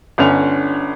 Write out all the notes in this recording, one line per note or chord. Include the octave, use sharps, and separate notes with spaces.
G1 D3 C#4 F7